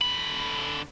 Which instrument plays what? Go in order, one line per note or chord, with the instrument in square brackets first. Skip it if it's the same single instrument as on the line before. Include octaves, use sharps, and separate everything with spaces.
[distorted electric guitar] D3 B5